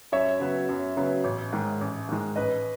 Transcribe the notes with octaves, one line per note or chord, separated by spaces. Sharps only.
F#2 C#5 E5
C#3 F#3 B3
F#2
C#3 F#3 B3
A1
G#2 D#3 G#3
A1
G#2 D#3 G#3
A1 B4 D#5